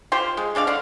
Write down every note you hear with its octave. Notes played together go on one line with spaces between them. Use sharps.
F4 G4 C5
G#3
G#3 D4 D5 F5
D3 F5 F#5